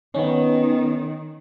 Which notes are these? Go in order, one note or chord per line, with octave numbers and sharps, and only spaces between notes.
D#3 B3 C#4